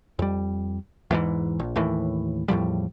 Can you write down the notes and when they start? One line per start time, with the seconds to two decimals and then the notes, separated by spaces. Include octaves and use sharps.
0.19 F2 G3
1.11 E2 G#2 E3
1.59 A#1
1.76 D#2 A2 E3
2.48 E2 A2 F3 G3